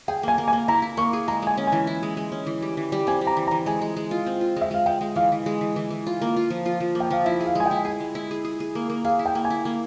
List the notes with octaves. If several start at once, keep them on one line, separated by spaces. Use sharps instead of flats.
G#4 G5
A#3 G#5
A#3
G#5
A#3
E4 A#5
E4
A#3 C#6
G#4
G#3 A#5
G#3 G#5
C#4
E3 G#5
E4
G#3
G#3
C#4
E3
G3
E3
G3
C4 G#5
G3
A#5
E3
A#5
E3
G#3 G#5
G#3
G#3
F4
C4
F4
G#3 E5
G#3 F5
G#3 G5
G#3
E3 F5
E3
G#3
E3
E3
E3
F4
A#3
F4
F3
F4
F3
A#3
G5
F3 F5
E4 E5
G#4
F5
G#3 G#5
G5
E4
G#4 G#5
G#3
E4
G#4
G#4
G#4
A#3
A#3
G#4 F5
E4
G5
A#3
G#5
E4
A#3